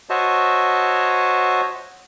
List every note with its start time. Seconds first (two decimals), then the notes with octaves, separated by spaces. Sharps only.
0.10 F#4 C5 C#5 D#5 E5 A5